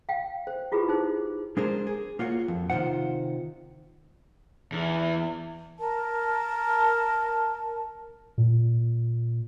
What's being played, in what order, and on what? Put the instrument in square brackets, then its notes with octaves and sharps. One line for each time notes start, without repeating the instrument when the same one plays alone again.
[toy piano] F5 G5
C5
E4 F4 G4 G#4 B4
D#4 G#4 C5
[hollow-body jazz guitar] G#3 D4 G#4 A#4 C5
G#4
A#3 F4 F#4 C#5
F2
C3 D#3 G#3 F4 C5 F#5
[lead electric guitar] E2
[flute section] A#4 A5
[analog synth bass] A#2